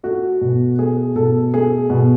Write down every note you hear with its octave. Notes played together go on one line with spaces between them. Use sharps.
A3 F#4
B2
A3 G#4
B2 A4
A3 G#4
B2